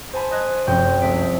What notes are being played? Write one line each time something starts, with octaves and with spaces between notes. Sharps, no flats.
C5 G#5 A5 B5
D#5 F#6 G#6
F1 F#2 F#4 G5 G6
C2 G#3 A3 B6 D7